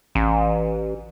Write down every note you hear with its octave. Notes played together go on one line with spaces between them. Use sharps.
A1